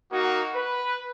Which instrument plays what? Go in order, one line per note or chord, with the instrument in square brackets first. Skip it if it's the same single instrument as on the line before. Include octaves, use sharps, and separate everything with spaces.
[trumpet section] A#3 D#4 F#4
B4